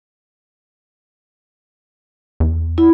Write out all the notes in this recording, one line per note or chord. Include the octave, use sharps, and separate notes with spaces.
E2
E4